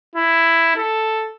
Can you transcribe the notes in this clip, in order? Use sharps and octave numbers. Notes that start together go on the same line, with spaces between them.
E4
A4